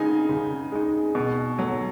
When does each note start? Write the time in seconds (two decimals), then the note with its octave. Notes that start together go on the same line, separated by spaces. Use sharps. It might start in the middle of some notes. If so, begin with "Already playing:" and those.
Already playing: C#3 G#3 D#4 G#5
0.29 C#3
0.72 G#3 D#4
1.15 B2
1.58 F#3 A3